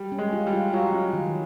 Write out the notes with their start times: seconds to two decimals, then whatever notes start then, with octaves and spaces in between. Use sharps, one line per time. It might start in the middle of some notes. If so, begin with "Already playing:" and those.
Already playing: G3
0.12 C#4
0.18 G#3
0.33 F4
0.47 G3
0.53 F4
0.73 F#3 F4
0.93 C#4
1.13 D#3